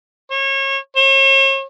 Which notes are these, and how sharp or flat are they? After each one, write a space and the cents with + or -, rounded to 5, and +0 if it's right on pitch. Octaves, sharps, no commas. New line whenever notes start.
C#5 -30
C#5 -40